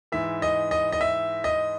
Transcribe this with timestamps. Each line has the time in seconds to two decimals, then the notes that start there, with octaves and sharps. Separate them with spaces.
0.12 G#2 E3 E5
0.42 D#5
0.71 D#5
0.92 D#5
1.01 E5
1.44 D#5